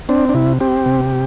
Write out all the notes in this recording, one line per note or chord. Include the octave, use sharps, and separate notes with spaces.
C4 D4
D4
C3 E4
C4 G4
C3